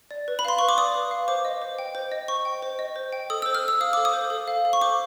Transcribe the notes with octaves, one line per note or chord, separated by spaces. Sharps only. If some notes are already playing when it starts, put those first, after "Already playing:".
D5
B4
B5
F5 C6
B4 C#6
D6
D5 D#6
B4
F5
C5 D6
D#5
C5
G5
C5
D#5
C5 C#6
G5
C5
D#5
C5
G5
A4 D#6
C5 E6
F6
A4 E6
F5 D#6
A4 D6
D#6
C5
A4
F5
A4
C#6
C5 D6